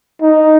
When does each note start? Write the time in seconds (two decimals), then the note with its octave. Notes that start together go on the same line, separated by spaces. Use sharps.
0.22 D#4